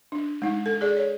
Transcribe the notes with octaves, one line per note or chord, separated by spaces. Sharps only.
D4
G#3 D#4
A4
G#4 D5
C#5